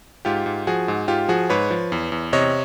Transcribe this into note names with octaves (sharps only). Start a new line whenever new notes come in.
G#2 F4 G4
G#2
F3 F#4 G#4
G#2
G#2 F4 G4
F3 F#4 G#4
G#2 B4 C#5
F3
E2
E2
C3 C#5 D#5